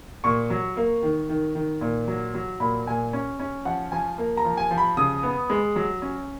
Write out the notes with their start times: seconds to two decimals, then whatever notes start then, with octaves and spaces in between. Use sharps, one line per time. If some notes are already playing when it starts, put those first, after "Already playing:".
0.24 A#2 C#6
0.50 F#3
0.77 A#3
1.03 D#3
1.29 D#3
1.55 D#3
1.81 A#2
2.08 F#3
2.34 F#3
2.60 A#2 B5
2.87 A#2 G#5
3.13 C#4
3.40 C#4
3.65 F3 F#5
3.92 F3 G#5
4.18 A#3
4.37 A#5
4.45 F3
4.57 G#5
4.71 F3
4.78 B5
4.97 C#3 D#6
5.23 B3
5.50 G#3
5.76 F#3
6.02 C#4